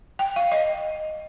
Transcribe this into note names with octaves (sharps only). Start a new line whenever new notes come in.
G5
F5
D#5